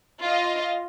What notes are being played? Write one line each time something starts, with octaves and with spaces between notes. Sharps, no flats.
F4 D#5